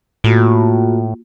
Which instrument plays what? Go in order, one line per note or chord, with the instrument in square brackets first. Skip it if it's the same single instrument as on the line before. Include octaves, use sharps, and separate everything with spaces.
[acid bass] A2 [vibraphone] A#3 F4 F#4